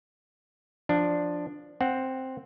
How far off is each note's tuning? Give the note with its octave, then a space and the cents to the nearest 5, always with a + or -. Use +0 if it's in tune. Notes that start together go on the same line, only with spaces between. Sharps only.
F3 +0 D4 +0
C4 +0 F#5 +0